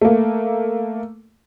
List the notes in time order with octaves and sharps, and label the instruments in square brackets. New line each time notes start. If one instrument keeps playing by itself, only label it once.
[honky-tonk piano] A3 A#3